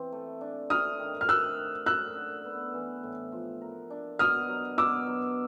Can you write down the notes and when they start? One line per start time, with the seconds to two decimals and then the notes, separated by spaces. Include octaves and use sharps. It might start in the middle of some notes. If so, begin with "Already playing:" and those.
Already playing: E3 C4
0.12 A3
0.41 D4
0.70 C4 D#6 F6
0.99 D#3
1.21 F6
1.29 A3 E6 F#6
1.57 D3
1.86 F#2 E6 F#6
2.15 D3
2.45 B3
2.74 E3
3.03 A2
3.32 F3
3.61 A#4
3.90 D4
4.19 B2 D#6 F6
4.49 F#3
4.78 B2 D6 E6
5.07 F#3